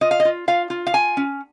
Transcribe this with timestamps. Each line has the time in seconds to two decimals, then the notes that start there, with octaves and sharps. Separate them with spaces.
0.01 F4 D#5
0.11 F5
0.20 D#5
0.25 F4
0.48 F4 F5
0.70 F4
0.87 F5
0.94 F4 G#5
1.17 C#4